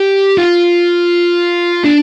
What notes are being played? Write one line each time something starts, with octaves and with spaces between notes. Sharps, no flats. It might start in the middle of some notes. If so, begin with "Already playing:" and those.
Already playing: G4
F4
D4